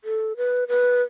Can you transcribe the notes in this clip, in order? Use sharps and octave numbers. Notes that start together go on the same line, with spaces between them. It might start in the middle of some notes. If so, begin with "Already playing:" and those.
A4
B4
B4